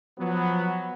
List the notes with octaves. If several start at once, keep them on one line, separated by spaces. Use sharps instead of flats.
F3 F#3 B3